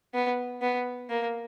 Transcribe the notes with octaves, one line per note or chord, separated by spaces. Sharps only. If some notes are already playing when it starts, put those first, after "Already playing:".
B3
B3
A#3